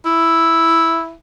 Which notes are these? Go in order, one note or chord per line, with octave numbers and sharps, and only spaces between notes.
E4